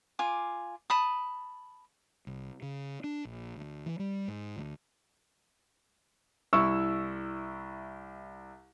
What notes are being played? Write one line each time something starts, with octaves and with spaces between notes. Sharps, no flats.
F4 G#5 D6
A5 B5 D#6
C2
C#3
D4
A#1
D2
E3
G3
G#2
D2
C2 E4 C#6 E6